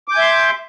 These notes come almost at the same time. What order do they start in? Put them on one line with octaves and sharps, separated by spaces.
D6 G6 G#5 E5 C6